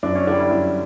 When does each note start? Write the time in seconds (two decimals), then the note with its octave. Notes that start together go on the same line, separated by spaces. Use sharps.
0.03 F#2 D4
0.15 C#4
0.27 D3 G3 D4
0.39 E4
0.51 F#2